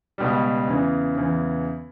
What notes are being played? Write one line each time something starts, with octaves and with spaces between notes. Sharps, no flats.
C#2 B2 G3
E2 C#3 E3
E2 C#3 E3